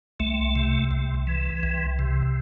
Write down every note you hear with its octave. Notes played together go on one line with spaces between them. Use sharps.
C2 A3
C3
C2
E3
C2
C3